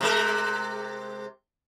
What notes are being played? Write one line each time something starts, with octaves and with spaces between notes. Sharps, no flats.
C3 G#3 A#4